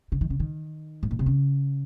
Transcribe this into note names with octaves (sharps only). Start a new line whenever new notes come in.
C#3
D#3
C#3
D#3
G#2
A#2
C3
C#3